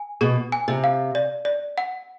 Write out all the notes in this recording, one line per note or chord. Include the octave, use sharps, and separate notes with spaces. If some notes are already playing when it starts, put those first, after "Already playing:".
Already playing: G#5
B2 G#4
G#5
C3
F5
D5
D5
F#5